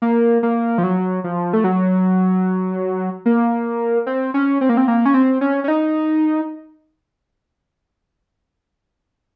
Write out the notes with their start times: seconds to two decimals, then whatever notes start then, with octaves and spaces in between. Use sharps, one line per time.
0.02 A#3
0.43 A#3
0.78 F3
0.84 F#3
1.24 F3
1.53 A3
1.64 F#3
3.26 A#3
4.06 C4
4.34 C#4
4.61 C4
4.69 A#3
4.77 C4
4.88 A#3
5.05 C#4
5.14 C4
5.41 C#4
5.64 C#4
5.68 D#4